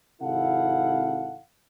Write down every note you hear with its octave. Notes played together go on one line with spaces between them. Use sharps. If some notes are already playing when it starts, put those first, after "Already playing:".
G#1 C3 E4 A4 F5 F#5